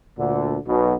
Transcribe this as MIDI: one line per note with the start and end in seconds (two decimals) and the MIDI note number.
0.18 0.56 38
0.18 0.56 46
0.18 0.56 50
0.67 0.95 35
0.67 0.95 47